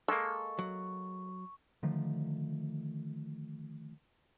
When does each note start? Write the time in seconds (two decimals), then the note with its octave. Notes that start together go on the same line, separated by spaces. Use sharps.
0.08 G#3 A#3 A4 C#6
0.59 F#3
1.83 D3 D#3 F3 A3